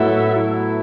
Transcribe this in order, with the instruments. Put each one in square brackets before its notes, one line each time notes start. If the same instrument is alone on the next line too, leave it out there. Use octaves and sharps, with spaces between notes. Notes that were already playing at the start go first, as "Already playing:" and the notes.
Already playing: [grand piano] A2 [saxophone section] F#3 B3 E4 A4 E5
[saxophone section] F#3 B3 E4 A4 E5